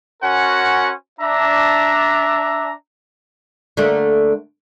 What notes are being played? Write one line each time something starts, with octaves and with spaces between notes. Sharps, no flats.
C#4 F#4 A#4 C5 F#5 G#5
D4 E5 A#5
D3 A3 A#3